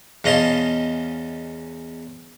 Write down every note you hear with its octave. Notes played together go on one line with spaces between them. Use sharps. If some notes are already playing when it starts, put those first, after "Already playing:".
E2 C#4 D#5 F5 A5 C6